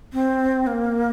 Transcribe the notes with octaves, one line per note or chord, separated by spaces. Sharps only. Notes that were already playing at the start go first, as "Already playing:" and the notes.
C4
A#3